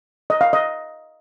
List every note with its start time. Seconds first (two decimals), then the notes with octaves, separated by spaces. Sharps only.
0.30 D#5
0.41 F5
0.53 D#5